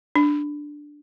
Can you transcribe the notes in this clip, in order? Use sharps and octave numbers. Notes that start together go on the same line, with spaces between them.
D4